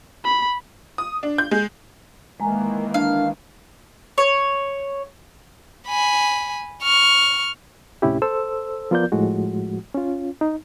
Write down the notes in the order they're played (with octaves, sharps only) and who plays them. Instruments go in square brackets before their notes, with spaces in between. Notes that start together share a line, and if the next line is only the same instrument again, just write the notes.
[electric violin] B5
[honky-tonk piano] D#6
D4
G6
G#3
[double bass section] D#3 E3 A#3 [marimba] G#3 G#5 A#5
[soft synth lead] D4 [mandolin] F5
[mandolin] C#5
[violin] G#5 B5
C#6 F6
[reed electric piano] D2 A2 C3 C#4 E4 G4
A4 C5 E6
F3 B3 F4 A#4 D5 G6
A2 F3 G#3 F#4
C#4 F4
D#4